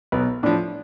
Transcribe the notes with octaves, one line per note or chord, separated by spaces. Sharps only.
B1 B3
A2 F3 D4